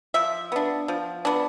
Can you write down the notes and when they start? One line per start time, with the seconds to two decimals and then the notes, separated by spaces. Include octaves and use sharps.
0.14 F3 E5
0.52 B3 D4
0.88 F3
1.25 B3 D4